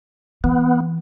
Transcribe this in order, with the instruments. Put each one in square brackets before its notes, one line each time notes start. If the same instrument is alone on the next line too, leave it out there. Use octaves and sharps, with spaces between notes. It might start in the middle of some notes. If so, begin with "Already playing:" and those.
[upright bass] E3 [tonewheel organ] B3